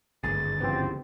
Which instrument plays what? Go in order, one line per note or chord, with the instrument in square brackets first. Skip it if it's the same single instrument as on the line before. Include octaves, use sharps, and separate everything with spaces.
[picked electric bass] G#1 D2 G2 [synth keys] G#4 [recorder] A6
[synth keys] C#3 E3 B3 [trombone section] F3 C4 G4